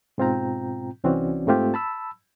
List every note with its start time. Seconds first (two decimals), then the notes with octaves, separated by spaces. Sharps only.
0.18 G#2 B2 C4 F4 G5 A#5
1.04 C2 E3 C4 C#4 F#4 D5
1.47 G#2 A3 C4 F4 G4
1.74 A5 B5 E6